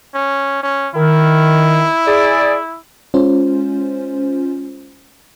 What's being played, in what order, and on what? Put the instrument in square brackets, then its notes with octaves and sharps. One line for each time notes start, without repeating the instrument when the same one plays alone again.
[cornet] C#4
C#4
[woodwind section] D#3 [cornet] E4
[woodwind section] G#4 D5
[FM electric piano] G#3 C#4 F4 C5